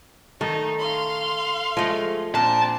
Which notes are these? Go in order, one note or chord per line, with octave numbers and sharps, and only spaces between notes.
D#3 A3 D#4
F5 C6
F3 G#3 A3
A#2 C4 D4 A5